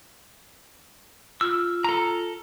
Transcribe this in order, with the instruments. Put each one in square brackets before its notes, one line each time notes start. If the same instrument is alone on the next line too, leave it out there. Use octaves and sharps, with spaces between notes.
[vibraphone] F4 [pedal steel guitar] E6
[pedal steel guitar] A4 A#5